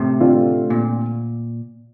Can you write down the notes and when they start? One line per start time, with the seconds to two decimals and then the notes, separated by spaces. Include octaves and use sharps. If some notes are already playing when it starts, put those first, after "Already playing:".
Already playing: A2 C3
0.20 D3 A3 C4 F4
0.70 A#2